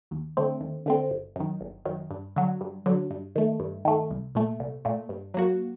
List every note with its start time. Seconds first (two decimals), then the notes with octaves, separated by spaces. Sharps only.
0.11 D#2
0.37 D3 A3 C4
0.61 D#2
0.86 D3 A3 C4
1.11 G1
1.36 F#2 D#3
1.61 G1
1.85 F#2 D#3
2.10 G2
2.36 D3 F#3
2.61 G2
2.86 D3 F#3
3.11 G2
3.35 D#3 A3
3.60 G2
3.85 D#3 A3
4.11 C2
4.35 A#2 A3
4.60 C2
4.85 A#2 A3
5.09 G2
5.34 F#3 A#3 F#4